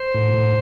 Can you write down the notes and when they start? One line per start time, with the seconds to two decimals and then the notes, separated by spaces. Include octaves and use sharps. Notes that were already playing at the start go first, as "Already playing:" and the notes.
Already playing: C5
0.14 A2
0.34 A2